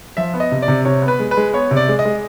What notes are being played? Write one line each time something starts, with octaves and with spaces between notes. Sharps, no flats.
F3 E5
B3
D#5
C3
D5
C3
C3 C#5
B3
B4
G#3
B4
G#3
B3 C#5
C3
D5
G#3
D#5
G#3